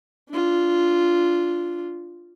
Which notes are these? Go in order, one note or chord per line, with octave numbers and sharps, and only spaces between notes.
D4 F4